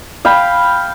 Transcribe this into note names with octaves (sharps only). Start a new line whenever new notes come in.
F5 G5 B5